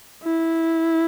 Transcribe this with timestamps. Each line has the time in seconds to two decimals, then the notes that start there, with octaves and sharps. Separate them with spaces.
0.24 E4